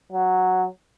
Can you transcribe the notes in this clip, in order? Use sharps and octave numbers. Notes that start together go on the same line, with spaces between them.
F#3